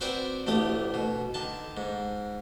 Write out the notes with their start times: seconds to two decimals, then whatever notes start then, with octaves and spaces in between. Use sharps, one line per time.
0.01 C4 F#4 A#4 B4 D5 G5
0.47 A1 D2 A3 G4 D#6
0.94 B2
1.34 D3 D#3 A5
1.77 G#2